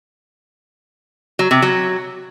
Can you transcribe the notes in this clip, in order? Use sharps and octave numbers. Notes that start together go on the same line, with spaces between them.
F#3
C3
F#3